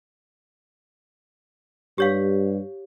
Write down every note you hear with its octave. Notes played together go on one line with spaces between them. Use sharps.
G2 G4 C#5 F5